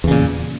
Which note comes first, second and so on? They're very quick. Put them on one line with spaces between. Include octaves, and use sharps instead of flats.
E2 C#3 A#2